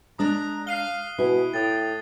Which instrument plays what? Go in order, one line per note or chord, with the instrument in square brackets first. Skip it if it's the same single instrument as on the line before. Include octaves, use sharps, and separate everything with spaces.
[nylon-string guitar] G#3 D4 [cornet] A#5 [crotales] D#6 F#6
[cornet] F5 [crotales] C7 D#7 G7
[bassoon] B2 [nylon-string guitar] E4 [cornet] G#4
[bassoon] A2 [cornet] G5 [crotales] D#6 A6